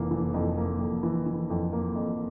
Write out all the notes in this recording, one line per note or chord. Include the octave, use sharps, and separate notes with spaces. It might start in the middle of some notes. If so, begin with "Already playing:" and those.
Already playing: F1 E3 A#3
E3
F2
A#3
F2
E3
E3
F2
A#3
F2